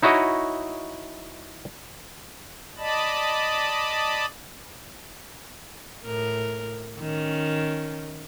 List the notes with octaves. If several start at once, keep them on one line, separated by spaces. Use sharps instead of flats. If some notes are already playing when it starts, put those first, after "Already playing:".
D#4 E4 F#4 C#5 D#5
D5 D#5 A5 B5
A2 A#4
D#3 C#4